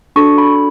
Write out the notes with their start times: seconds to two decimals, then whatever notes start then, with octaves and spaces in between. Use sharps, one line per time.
0.16 D4 F#4 A4 C#6
0.38 B5